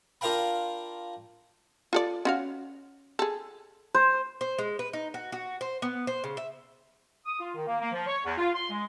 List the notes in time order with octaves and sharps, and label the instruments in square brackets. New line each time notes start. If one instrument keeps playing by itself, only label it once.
[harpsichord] D4 F4 A#4 F5 G5 B5
[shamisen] F4 A4 D5
C#4 F#4 F5
G#4 A4
[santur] C5
[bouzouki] C5
G#3
B4
D#4
F#4
F#4
C5
B3
C5
C#3
E5
[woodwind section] D#6
F4
D#3
A#3
A#3
F3
C#5
E2
F4
C6
G#3